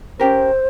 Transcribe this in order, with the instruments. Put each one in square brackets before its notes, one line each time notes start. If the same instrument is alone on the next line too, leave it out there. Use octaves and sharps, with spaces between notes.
[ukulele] C#4 G4 A#4 [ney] C5